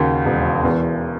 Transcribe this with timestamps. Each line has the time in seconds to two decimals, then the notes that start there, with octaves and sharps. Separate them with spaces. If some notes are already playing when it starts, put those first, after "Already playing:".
Already playing: D#2 C#3 F#4
0.25 E1
0.63 E2